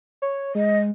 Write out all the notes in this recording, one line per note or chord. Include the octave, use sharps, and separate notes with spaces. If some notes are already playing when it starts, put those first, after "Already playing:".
C#5
G#3 D#5